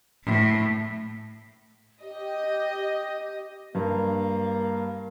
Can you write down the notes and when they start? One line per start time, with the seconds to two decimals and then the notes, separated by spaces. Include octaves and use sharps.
0.24 A2
2.02 G4 D#5
3.75 G2 A#3